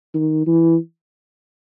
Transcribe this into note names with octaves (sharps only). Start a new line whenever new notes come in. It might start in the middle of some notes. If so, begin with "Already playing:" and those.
D#3
E3